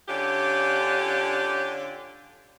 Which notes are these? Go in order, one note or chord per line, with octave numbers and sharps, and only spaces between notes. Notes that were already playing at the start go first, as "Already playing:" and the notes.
D3 C#4 D4 F4 G4